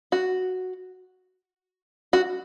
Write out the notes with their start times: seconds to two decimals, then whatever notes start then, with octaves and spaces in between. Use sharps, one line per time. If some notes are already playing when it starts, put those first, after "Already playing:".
0.12 F#4
2.13 F#4